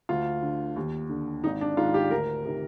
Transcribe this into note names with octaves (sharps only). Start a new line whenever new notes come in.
D2 F4
D3
D#2
D3
G#1 D#4
D4
G#2 D#3 F4
G4
D2 A#4
C3 D#3